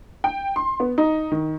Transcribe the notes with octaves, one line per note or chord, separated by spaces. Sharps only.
G5
C6
B3
D#4
D#3